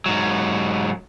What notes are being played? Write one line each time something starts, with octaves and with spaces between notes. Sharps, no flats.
G#2 F#3